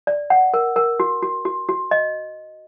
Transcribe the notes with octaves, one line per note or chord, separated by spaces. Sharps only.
D5
F#5
A#4
A#4
F#4
F#4
F#4
F#4
D#5